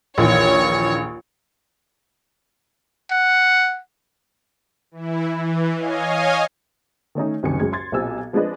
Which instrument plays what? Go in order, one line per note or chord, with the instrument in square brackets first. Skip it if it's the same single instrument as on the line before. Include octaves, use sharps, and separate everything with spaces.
[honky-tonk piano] A#1 D#2 E3 [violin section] C#5
[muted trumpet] F#5
[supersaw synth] E3 E4
E3
C#5 D#5 F5 G#5
[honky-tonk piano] D#3 A3 C#4 D#4
F#1 C2 D#3 G#5 C#7
F#2 G#3 G#6
C6 G#6 A6
B1 A#2 C4 G4 G#5 E6
F3 G#3 C4 D4 B4 D#5